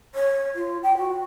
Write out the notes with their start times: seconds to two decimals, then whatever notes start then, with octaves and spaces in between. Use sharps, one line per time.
0.15 C#5
0.55 F4
0.83 G5
0.98 F#4